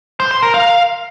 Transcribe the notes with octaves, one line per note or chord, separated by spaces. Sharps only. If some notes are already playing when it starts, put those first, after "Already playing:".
C5
C6
A#4
F5